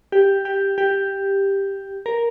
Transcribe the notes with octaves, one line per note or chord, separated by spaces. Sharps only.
G4
G4
G4
A#4